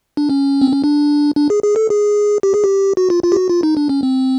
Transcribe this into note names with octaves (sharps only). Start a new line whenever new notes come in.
D4
C#4
C4
C#4
D4
D4
G#4
G#4
A4
G#4
G4
G#4
G4
F#4
F4
F4
G4
F#4
F4
D#4
D4
C#4
C4